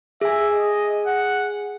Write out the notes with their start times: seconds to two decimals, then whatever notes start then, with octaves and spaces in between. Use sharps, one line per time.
0.21 G#4 E5 G#5
0.54 D#5
1.07 F#5